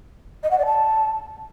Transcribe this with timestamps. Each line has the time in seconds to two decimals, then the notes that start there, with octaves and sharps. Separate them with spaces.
0.43 D#5
0.51 F#5
0.58 D5
0.66 A5